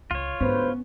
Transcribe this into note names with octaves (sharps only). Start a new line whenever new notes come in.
C#2 F4 C#5
D2 G#2 B3 C#4 B4 C5